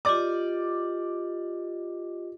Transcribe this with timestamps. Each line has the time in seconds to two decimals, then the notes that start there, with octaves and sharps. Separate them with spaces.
0.05 F4 G4 D5 D#5 D6